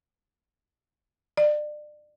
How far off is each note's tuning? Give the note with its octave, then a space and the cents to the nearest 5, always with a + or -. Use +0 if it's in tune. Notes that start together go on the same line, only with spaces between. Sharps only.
D5 +30